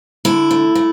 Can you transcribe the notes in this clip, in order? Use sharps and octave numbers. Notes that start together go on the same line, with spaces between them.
D3 E4
A3
A3